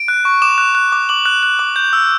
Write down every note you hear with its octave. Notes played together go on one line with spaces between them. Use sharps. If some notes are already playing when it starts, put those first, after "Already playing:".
Already playing: D7
F#6
C#6
D6 E7
F#6
F#6
D6
D6 F#7
F#6
F#6
D6
G6
E6